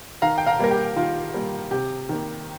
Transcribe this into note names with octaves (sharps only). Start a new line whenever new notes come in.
D#3 F5 A#5
G5
F5 A#5
G3 A#3 A#4
G4
D#3 F4
G3 A#3
C3 G4
D#3 A#3